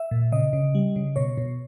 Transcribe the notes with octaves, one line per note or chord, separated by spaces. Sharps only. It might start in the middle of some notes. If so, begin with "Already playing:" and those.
Already playing: E5
A#2
C#3 D#5
C#3
G3
C#3
B2 C#5
B2